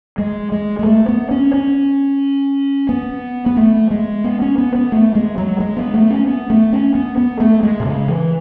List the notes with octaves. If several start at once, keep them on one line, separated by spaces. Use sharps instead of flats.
G#3
G#3
G#3
A3
B3
C#4
C#4
B3
B3
A3
G#3
B3
C#4
B3
B3
A3
G#3
F#3
G#3
B3
A3
C#4
B3
A3
C#4
B3
B3
A3
G#3
B2
C#3
E3